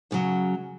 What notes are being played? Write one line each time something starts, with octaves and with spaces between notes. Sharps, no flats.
F#2 C#3 F#3